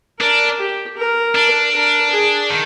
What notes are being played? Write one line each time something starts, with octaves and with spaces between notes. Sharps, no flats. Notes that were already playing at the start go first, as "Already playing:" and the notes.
D4 A#4
G4
A#4
D4
A#4
G#4
D#3